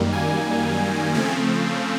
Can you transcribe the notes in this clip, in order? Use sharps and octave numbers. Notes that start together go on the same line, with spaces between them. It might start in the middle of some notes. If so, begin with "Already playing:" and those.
Already playing: F#2 D#3 G3 A#3
G#5
C#3 F3 A3 C4